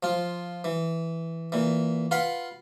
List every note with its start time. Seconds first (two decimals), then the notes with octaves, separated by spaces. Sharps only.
0.03 F3 F4
0.64 E3
1.52 A#2 E3
2.11 F4 B4 F5 F#5 B5